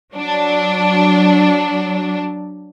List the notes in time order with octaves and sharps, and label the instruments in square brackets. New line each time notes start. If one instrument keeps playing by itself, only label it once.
[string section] F#3 D4